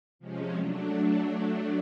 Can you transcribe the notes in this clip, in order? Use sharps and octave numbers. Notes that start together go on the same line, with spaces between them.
C3 F3 G#3 C#4
F#3 A3 D4